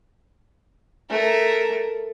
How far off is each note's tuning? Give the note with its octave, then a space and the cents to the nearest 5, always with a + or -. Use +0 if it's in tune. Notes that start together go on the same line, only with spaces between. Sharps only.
A3 +0 A#4 +0